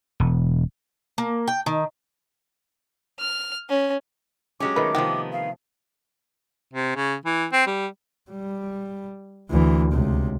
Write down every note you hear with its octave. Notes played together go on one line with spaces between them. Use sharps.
E1
A#3
G5
D#3
F6
C#4
F#3 G#3 C#4 G4 D6
D#3 A3 B4
C3 D#3 F3 B3 D#4 G4
F5
C3
C#3
E3
C4
G3
G3
D2 E3
C#2 C3